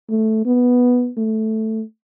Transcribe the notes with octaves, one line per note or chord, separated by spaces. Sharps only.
A3
B3
A3